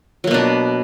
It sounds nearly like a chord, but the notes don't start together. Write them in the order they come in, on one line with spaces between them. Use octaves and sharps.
F#3 A#3 B2 D4